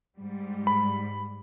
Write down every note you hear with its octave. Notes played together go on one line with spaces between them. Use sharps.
G#2 G3
B5